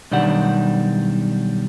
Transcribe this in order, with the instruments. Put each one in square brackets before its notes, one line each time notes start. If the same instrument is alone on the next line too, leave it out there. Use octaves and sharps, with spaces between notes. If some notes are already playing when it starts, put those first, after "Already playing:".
[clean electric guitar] B1 D#3 G3 D4 F#5